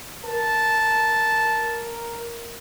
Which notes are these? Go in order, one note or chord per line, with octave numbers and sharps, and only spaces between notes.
A#4 A5